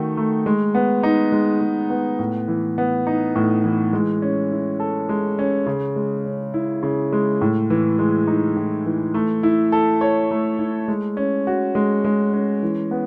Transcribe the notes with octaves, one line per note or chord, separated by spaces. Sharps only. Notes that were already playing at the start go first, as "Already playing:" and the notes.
Already playing: D#3 A3 D#4 F#4
A3
G#3
B3
D#4
G#3
G#3
B3
A2
E3
B3
D#4
A2
E3
G#3
C#4
E4
A4
G#3
C#4
C#3
G#3
C#4
E4
C#3
G#3
A2
E3
G#3
D#4
A2
E3
A3
E4
A4
C#5
A3
E4
G#3
C#4
F#4
G#3
G#3
C#4
E3
B3